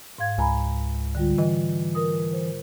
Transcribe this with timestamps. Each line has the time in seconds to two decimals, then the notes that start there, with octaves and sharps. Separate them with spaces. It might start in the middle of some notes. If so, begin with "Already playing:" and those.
0.18 G#2 F5 G#6
0.38 C#2 G#5 A#5 B5
1.15 D3 G3 F4
1.38 E3 D#5
1.95 A#4 D#6
2.33 C5